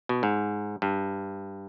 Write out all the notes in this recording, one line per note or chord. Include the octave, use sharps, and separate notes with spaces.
B2
G#2
G2